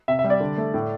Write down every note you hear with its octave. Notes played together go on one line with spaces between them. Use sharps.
C3 E5
E5
G3
D5
D3
A3
A2